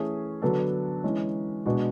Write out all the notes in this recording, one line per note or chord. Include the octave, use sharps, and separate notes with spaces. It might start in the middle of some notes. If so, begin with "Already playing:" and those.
Already playing: E3 A3 C#4 G#4
D3 F#3 B3 D4 A4
E3 G#3 C#4
B2 G#3 D4 F#4